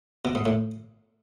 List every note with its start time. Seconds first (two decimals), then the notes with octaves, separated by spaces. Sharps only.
0.25 B2
0.35 G#2
0.46 A2